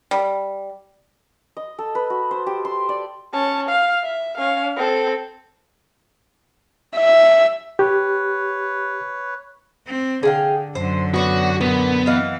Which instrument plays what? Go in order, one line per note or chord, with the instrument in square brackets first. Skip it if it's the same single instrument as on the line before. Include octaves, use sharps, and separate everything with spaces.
[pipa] G3
[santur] D#5
A4
B4
F#4
C5
G4
C6
D5
[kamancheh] C#4 A5
F5
E5
C#4 F5
C4 A4
[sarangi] E5
[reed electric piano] G4 [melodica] B4 C#5
[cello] C4
[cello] D3 [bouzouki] G#4 F5 G5
[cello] F#2 D3 [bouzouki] C5
[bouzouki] B3 C#5 D5 [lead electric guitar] F#4
[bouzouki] A#2 [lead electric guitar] B3
[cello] E3 [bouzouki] D#5 F5 F#5